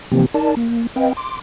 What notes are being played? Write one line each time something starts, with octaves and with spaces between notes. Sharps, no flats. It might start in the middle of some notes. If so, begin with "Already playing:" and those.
C3 E3 F3 A#3 C4 G4
D#4 A#4 D5 A5
A#3
C4 B4 D#5 F5 G5
C6 D6